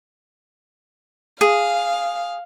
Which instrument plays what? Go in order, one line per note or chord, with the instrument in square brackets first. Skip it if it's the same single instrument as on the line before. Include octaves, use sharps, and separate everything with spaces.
[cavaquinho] G#4 [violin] F5